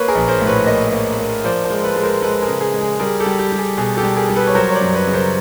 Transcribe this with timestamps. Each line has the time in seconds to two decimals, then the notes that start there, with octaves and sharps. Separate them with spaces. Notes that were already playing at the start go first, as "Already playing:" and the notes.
Already playing: A#3 B4 C#5
0.08 G#4 A#4
0.15 A#1
0.28 A#4 C5
0.42 A2
0.47 B4 C#5
0.66 A#3 C#5 D#5
0.92 A#3
1.18 A#3
1.44 F3 C5 D5
1.64 A#4 C5
1.70 G#3
1.84 A4 B4
1.96 G#3
2.03 A#4 C5
2.22 G#3 A4 B4
2.42 G#4 A#4
2.48 C#3
2.61 G#4
2.74 G#3
2.81 G#4
3.00 G3 G#4 A#4
3.20 G4 A4
3.26 G3
3.39 G4
3.52 G3
3.58 G#4
3.77 B2 G#4
3.97 G4 A4
4.03 G3
4.16 G#4 A#4
4.29 G3
4.36 A4 B4
4.47 C#5
4.55 F#3 A#4 C5
4.69 C#5
4.75 C5 D5
4.81 F#2
4.94 B4 C#5
5.07 C#3
5.14 A#4 C5